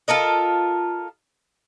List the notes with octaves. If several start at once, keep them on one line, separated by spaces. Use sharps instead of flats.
F4 A4 A#4 D#5